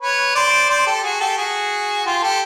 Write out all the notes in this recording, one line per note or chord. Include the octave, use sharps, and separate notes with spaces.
B4 C#5
C5 D5
C5 D5
G4 A4
F#4 G#4
G4 A4
F#4 G#4
F4 G4
G4 A4